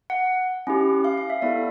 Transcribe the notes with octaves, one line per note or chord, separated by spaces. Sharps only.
F#5
C#4 E4 G4
F5
F5
E5
B3 E4 A4 D5